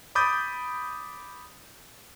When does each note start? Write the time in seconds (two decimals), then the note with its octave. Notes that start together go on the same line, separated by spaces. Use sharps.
0.15 B5 D6 D#6 G6 A6